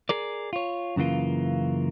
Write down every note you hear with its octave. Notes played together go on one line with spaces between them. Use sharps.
G#4 A#4 D5
F4 C#5
F#2 C#3 E3 A#3 F4